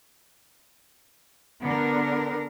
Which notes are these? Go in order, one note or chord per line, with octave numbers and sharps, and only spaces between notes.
D3 B3 D4 A#4